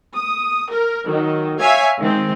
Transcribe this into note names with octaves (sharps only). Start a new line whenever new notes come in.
D#6
A#4
D#3 F#3
C#5 E5 F5 G#5 G#6 B6
D#3 G#3 C4